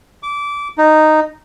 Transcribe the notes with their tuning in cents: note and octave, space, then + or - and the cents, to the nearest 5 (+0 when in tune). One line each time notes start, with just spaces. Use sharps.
D6 -20
D#4 -5